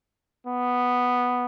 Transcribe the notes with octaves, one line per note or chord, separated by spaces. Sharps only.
B3